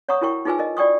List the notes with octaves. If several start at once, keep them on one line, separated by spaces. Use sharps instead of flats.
C#5 F#5 A#5 C#6 D#6
E4 F#4 A#4 G5 C#6
D#4 F4 G#4 B4 G#5 E6
A#4 D#5
F#4 D5 G5 C#6 D#6